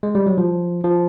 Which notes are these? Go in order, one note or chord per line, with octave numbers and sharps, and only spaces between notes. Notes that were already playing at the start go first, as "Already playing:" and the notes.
G#3
G3
F#3
F3
F3